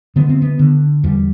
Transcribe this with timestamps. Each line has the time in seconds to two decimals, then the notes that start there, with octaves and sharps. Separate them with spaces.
0.16 D3 B3
0.29 C4
0.42 B3
0.59 D3
1.03 E2 G3